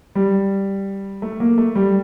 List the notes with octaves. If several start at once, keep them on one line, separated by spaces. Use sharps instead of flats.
G3
A3
A#3
A3
G3